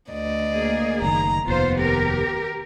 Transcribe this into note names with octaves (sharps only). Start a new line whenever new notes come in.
D2 D5 D#5
A#3 G#4
F#1 C3 D#3 A#5
F1 D#2 B3 F4 C5
G4 A#4